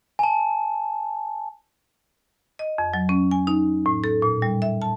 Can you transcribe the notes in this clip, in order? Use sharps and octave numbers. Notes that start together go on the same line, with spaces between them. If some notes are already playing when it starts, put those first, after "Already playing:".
G#5 A5
D#5
F2
F#3
C#4
G#5
D#4
A2
A4
A#2
G3
E5
A5